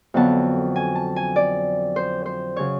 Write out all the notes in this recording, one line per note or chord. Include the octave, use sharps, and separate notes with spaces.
F2 D3 F#3 B3 A5
G#5
A5
G#5
D5
C5
C5
C#3 F#3 C#5